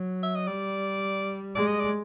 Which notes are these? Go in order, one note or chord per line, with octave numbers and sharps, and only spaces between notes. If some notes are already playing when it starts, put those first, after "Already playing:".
Already playing: F#3
E5
D#5
G3 D5
G#3 D5
D#5
D5